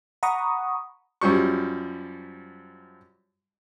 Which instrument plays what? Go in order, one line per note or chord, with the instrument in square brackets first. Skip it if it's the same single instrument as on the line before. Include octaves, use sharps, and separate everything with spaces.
[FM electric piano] F#5 A#5 B5 C#6 D#6
[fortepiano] F#2 F3 G3 C#6